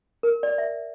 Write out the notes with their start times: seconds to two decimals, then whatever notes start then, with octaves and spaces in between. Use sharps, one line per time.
0.23 A#4
0.43 D5
0.58 E5